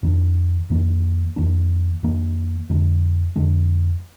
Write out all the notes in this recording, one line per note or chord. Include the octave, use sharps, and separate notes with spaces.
F2 D#3 A#3 D4
F2 D#3 A#3 D4
F2 D#3 A#3 D4
F2 D#3 A#3 D4
F2 D3 G#3 D4
F2 D3 G#3 D4